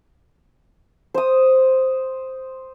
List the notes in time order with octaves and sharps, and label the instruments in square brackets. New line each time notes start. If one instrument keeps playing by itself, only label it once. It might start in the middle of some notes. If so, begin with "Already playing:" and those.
[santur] C5 D#6